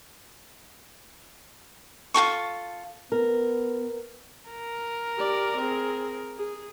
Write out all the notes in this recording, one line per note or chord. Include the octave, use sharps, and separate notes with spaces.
F4 F#4 A4 C#6
B3 A#4
A#4
G4 D5
C4 G#4
G#4